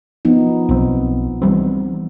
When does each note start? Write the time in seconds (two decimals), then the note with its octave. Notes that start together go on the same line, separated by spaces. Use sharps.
0.25 F3 B3 D#4
0.69 B1 C4
1.42 E3 G3 C4